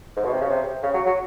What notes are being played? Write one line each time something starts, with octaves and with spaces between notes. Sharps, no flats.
G#2
B2
C3
C#3
C3
C#3
F#3
F#3